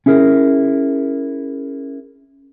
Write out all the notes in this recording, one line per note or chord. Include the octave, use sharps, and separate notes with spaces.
C#4 E4 G#4 A#4